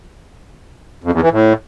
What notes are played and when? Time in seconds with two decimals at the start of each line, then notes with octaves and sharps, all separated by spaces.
1.04 F2
1.13 E2
1.22 E3
1.31 A2